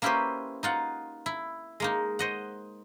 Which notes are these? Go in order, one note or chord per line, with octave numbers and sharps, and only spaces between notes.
A#3 C#4 E4 G4 B4 C5
D#4 F4 F#5
E4
G#3 A#3 D#4
C5 D#5 F#5